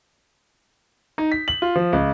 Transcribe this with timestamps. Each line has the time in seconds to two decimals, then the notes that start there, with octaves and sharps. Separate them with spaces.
1.18 D#4
1.32 B6
1.48 F#7
1.62 F4
1.76 F3
1.93 C#2